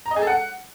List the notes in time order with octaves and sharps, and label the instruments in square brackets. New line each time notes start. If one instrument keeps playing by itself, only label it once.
[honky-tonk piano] A#5
D#5
G#4
A4
F#5